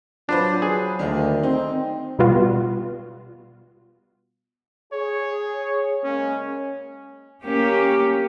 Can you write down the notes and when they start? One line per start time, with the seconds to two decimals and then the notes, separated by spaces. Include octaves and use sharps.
0.29 F#3 D4 F4 B4 C5
0.62 G#4
0.99 D2 D#3 A#3 D4
1.43 C4 D#4
2.19 B2 G3 B3 F4 F#4
4.93 G#4 C#5
6.04 C#3 G#3 A#3 C#4
7.45 A#3 C#4 G4